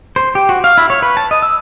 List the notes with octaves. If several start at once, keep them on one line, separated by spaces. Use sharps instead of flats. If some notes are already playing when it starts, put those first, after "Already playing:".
C5
G4
F#4
F5
E4
C#5
B4
A5
D#5
E6